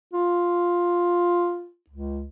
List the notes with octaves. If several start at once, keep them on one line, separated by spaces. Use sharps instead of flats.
F4
C#2